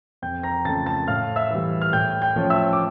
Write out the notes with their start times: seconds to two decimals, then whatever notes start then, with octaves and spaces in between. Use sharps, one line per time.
0.22 F2 G5 G6
0.43 A#5 A#6
0.65 C#3 F3 A3 A5 A6
0.86 A5 A6
1.08 A2 F5 F6
1.36 E5 E6
1.51 E3 G3
1.82 F6
1.93 A2 G5 G6
2.22 G5 G6
2.36 F3 A3 C#4 F4
2.50 E5 E6
2.73 D6